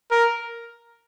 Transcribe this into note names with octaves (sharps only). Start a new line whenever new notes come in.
A#4